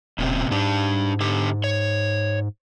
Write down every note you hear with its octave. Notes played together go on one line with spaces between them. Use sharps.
E1 A#2 C#3 C4
G#2 D4 G4 A5
D3 G4
C#5